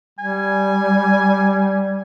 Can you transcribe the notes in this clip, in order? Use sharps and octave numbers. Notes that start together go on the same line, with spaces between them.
G3 G#5